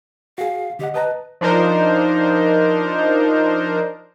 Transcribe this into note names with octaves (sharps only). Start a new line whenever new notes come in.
F#4 G#4 F5
D3 G4 D#5 F#5
B4 D#5 A5 A#5
F3 D4 D#4 A#4 C5